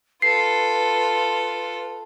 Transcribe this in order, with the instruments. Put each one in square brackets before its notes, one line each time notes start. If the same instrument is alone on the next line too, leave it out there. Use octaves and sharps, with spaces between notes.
[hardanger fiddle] F4 A4 [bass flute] B4 [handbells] C7